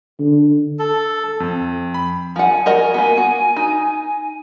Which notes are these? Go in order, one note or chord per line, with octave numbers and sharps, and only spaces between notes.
D3
A4
F2
B5
F3 F#5 G#5
F#4 A#4 D#5
A#3 B3
F#4
D#4